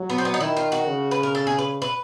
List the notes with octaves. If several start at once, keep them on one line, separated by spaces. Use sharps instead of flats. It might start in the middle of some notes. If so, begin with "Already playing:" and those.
Already playing: F#3
B3
C4
B3
D#4
D#3 E4
F4
F#4
C#3
B4
A#4
A4
G#4
B4
B4